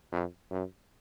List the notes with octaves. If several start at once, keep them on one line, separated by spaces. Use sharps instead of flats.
F2
F#2